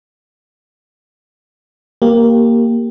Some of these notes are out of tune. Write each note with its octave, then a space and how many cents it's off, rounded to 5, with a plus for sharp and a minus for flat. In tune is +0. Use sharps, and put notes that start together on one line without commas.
A#3 +0 G4 +0